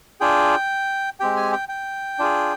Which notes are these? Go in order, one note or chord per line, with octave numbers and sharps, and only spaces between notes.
D4 F4 G#4 G5
G#3 C4 G4 G5
G#5
G5
G5
D4 F4 G#4